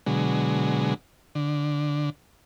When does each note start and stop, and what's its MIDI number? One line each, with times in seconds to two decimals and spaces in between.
0.06 0.94 47
0.06 0.94 50
0.06 0.94 54
0.06 0.94 56
1.35 2.10 50